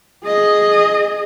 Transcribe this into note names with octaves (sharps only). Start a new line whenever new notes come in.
G#4 D#5